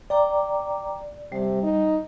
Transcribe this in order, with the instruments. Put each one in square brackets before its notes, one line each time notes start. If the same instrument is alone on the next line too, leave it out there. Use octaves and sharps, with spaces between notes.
[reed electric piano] D5 [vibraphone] G5 A#5 D6
[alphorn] C3 [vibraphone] G3
[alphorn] D#4